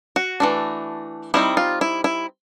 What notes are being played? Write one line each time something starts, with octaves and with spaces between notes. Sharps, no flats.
F#4
E3 A3 D4
G3 C4 D#4 E4
F4
E4
E4